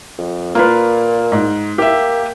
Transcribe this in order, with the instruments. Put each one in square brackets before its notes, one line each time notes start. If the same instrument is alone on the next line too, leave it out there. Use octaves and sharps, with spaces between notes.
[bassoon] F2
[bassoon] A#2 [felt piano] A#3 F4 B4
[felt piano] G#2
[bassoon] A#3 [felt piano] G4 E5